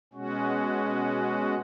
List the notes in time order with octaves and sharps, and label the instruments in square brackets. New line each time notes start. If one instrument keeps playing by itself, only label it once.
[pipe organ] B2 G#3 C#4 F#4